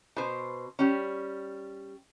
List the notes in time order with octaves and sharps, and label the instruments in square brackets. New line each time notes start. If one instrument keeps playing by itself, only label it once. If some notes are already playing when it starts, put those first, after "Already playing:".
[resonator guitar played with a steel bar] B2 C5
G3 C#4